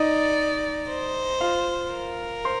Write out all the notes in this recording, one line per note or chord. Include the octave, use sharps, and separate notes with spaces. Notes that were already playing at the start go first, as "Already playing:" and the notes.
Already playing: D#4 D5 D#5
C5
F4 F5
A#4
C5 C6